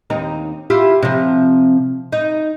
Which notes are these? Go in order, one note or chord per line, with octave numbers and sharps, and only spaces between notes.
D#2 C4 D#4
E4 F4 G4
C3 F3
D#4